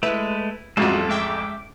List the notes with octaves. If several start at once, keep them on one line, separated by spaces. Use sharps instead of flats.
G#3 A3 E4 B4
A1 F2 G3 G#3 F4 F#4 A4
G#3 E5 G5 D6